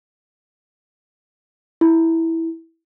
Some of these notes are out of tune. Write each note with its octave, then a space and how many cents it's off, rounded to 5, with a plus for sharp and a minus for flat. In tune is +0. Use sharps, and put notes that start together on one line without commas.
E4 -10